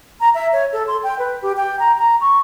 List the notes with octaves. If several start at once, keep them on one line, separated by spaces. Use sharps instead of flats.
A#5
E5
C#5
A4
C6
G5
B4
G4
G5
A#5
A#5
C#6